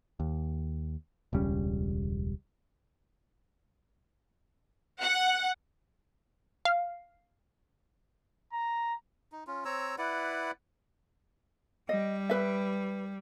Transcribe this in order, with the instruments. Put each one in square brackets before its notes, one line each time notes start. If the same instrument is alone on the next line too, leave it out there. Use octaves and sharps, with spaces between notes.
[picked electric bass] D#2
E1 C#2 G3 C#4
[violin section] F#5
[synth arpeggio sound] F5
[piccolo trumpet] A#5
[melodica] D#4
C#4 F4
C4 C#5 A#5 E6
E4 B4 D5 F#5
[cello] G3 [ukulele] D#5
[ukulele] B4 E5